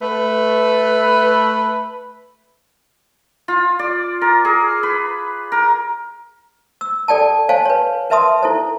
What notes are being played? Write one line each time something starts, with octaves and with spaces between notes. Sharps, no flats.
A3 B4
F4
D5
A#4
G#4
B4
A#4
E6
A4 D5 G5 A5
C5 C#5 F5 G#5 A5
B4 C#5
A#4 B4 E5 A5 C6 D#6
E4 A4 C5